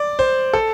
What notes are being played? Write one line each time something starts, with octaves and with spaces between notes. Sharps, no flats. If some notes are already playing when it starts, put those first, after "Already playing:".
Already playing: D5
C5
A4